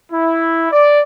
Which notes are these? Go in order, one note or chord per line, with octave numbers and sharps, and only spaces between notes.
E4
D5